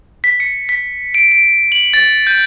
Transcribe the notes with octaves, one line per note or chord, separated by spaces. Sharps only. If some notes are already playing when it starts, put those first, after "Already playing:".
B6
C#7
B6
D7
D7
F#7
A6
G6